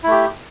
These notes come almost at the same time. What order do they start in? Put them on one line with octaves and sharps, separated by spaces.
E4 A3 G4